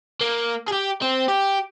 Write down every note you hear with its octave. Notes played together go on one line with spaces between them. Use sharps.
A#3
G4 G#4
C4
G4